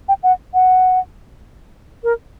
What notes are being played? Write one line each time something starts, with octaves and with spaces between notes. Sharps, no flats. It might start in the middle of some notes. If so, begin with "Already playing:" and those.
G5
F#5
F#5
A#4